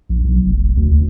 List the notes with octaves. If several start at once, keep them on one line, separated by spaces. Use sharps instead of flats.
A#1
B1
F1
D2
D2